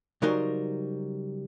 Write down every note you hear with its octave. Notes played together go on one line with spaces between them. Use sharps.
C#3 F#3 G3 D#4 A#4 C5